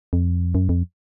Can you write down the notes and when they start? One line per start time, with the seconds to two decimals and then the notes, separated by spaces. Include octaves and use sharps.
0.13 F2
0.55 F#2
0.69 F2